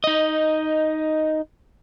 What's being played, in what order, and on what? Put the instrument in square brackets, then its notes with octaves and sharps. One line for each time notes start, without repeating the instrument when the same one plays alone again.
[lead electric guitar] D#4 D#5